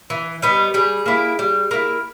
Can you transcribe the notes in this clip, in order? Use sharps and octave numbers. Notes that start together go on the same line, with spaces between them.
E3
G3 B3 D#4
G3 G#4
A#3 E4
G3
A#3 E4